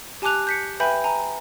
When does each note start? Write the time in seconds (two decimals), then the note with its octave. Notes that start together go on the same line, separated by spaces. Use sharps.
0.22 G4 G#5 A5 D6 F#6 F7
0.47 G6 B6 C#7
0.80 B4 E5 G5 G#5 B5 G6
1.04 G#5 A#5